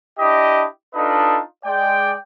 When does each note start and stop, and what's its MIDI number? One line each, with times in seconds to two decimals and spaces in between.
0.19 0.65 62
0.19 0.65 64
0.19 0.65 67
0.19 0.65 75
0.94 1.39 62
0.94 1.39 63
0.94 1.39 65
0.94 1.39 69
0.94 1.39 71
0.94 1.39 75
1.65 2.15 56
1.65 2.15 74
1.65 2.15 79